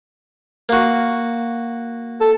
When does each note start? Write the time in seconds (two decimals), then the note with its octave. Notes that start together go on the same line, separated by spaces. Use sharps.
0.69 A#3 F#4
2.21 A4